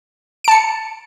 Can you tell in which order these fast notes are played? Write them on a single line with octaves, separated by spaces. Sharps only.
D7 A5 C#7